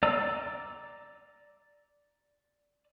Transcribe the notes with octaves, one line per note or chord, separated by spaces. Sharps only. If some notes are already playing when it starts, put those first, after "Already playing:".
D5 A#5 E6